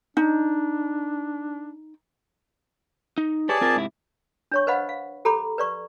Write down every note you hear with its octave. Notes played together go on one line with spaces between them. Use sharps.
D4 D#4
D#4
G4 G#4 B4 C#5 D5 A5
C4 F4 A#4
G#2 C3 E4
D4 C#5 C#6
B4 C5 D#5 F5 F#5 B5
F5
G4 A4 A#5 B5 D6
B4 D5 C#6